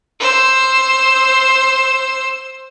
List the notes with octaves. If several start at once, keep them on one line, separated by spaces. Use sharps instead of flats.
C5 E6